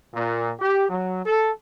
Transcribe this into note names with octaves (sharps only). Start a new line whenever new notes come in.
A#2
G4
F#3
A4